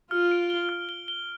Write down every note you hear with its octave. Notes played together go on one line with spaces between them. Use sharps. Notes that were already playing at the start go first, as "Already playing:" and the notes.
F4 F6
D7
G7
F6
G7
G7